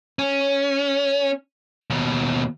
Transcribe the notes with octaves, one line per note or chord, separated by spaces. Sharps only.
C#4
D#2 B2